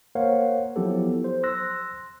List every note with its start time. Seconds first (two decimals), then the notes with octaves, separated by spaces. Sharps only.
0.15 A#3 A#4 C5 C#5 F5 F#5
0.76 F3 F#3 B3 E4 G4 A4
1.24 C5
1.43 C6 E6 F#6 A#6